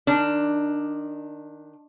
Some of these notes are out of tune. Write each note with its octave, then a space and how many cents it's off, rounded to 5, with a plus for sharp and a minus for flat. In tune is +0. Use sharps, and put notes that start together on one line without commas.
D#3 -10 D4 +5